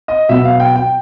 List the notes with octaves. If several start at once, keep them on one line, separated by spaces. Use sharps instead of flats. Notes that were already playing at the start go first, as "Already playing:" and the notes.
D#5
B2 F#3 B3 E5
F5
G5
G5